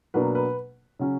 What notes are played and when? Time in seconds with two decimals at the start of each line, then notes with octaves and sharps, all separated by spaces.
0.14 B2 F#3 A#3 D4 B4
0.35 B4
0.99 C#3 F#3 C#4